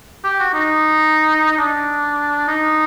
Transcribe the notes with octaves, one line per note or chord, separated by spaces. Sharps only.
G4
F#4
D#4
D4
D#4